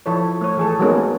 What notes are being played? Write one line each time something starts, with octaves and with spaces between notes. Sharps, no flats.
F3 E4 A4 C#5
A3 C#5
E3 G#4 A4
F#3 G#3 A#3 B3 C#4 D#4